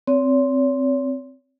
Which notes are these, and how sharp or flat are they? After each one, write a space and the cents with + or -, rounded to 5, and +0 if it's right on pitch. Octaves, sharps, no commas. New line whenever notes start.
C4 +0 C#5 +40